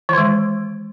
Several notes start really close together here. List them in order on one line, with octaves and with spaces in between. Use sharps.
E3 D#3 G#3